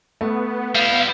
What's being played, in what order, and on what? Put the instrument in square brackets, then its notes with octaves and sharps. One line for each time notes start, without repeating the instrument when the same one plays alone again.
[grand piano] A3 [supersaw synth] B3
[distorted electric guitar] G3 E4 [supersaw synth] B3 [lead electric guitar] F5